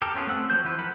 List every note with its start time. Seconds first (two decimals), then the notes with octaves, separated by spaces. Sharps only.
0.02 G4 A4 A#4
0.14 B3 C#4 F4 G#4
0.27 A3 C4 F#5 E6
0.50 F3 F#3 F#4 C5 G6
0.64 E3 F3 E4 B4
0.79 A4 A#4 F#5 B5